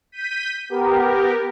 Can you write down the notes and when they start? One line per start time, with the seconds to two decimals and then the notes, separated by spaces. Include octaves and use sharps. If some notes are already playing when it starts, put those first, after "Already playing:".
0.12 G6 B6 D#7
0.69 B3 G4 A#4